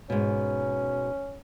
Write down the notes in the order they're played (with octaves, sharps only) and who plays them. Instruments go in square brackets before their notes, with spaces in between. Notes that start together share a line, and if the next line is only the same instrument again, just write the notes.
[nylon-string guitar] G#2 B2 [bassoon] C#4